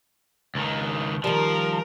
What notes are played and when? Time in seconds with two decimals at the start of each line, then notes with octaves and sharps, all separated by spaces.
0.55 C#2 D#3
1.24 D#3 F3 G3 A#4